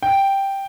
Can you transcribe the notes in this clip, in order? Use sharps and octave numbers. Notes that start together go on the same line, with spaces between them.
G5